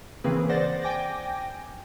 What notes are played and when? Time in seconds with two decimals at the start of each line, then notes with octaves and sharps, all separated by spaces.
0.24 C#3 E3 A#3 C4 G#4 B4
0.49 C5 D5 F#5 A6 A#6
0.83 G5 G#5 D6 A#6